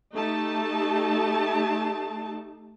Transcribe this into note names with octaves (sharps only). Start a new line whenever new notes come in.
A3 D#4 G4 A5